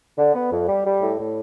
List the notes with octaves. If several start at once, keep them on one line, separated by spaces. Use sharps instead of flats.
D3
B3
F2
G3
G3
A2
A2